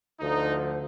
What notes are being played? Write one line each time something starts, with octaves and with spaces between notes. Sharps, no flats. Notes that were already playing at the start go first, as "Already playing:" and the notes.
D2 D3 F3 D#4